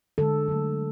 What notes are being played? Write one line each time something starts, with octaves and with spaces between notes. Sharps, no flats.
D3 G#3 A4
D3 F#3 A3